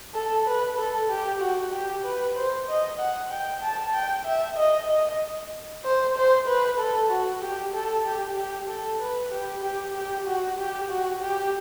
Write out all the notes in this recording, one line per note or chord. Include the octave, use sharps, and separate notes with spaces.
A4
B4
A4
G4
F#4
G4
B4
C5
D#5
F#5
G5
A5
G5
E5
D#5
D#5
C5
C5
B4
A4
F#4
G4
A4
G4
G4
A4
B4
G4
G4
G4
F#4
G4
F#4
G4